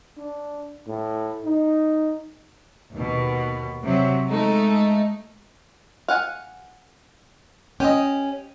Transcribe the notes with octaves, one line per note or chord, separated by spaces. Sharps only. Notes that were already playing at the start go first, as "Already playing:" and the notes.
D4
A2
D#4
D#2 B2
C3 F#3
G#3 A3 D#4
F5 F#5 G#5
C#4 G4 D#5